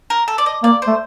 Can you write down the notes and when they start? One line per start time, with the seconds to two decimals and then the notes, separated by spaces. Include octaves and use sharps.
0.10 A#4
0.28 A4
0.38 D5
0.46 D#5
0.63 A#3 D5
0.82 C5
0.87 A3